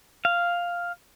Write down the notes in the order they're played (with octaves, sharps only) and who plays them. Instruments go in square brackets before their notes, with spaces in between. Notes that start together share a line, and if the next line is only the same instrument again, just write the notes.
[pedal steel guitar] F5